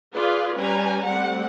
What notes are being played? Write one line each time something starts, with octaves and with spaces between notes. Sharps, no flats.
F4 G#4 B4 D5
G3 C#4 B4 G#5 A#5
G3 A3 C4 F#5